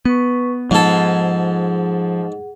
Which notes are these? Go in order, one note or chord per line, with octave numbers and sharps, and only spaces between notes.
B3 B4 C#6
G#2 F3 G#4 A4 F#5